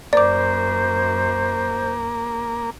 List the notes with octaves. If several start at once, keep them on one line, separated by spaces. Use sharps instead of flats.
F#2 A#3 C5 D5 D6